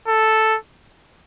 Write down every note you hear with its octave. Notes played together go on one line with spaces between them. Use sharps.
A4